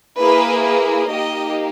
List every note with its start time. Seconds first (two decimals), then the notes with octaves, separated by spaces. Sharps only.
0.19 A#3 E4 G#4 B4
0.64 B4
1.09 A#3 D#4 G4 D#5